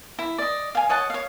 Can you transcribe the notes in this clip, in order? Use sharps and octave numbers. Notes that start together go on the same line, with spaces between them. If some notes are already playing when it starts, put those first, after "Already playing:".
E4
D5 D#5
F5 G#5
C#5 D#5 F#5 A5
C#5 F5